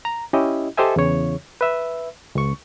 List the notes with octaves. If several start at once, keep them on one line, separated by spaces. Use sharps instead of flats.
A#5
C#4 E4 G4 D#5
G4 A4 C5 D#5 E5 G#5
E2 C#3 C#5
B4 E5
C#2 C#6